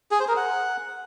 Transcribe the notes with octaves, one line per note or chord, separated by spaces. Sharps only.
G#4
C5
A#4
F#5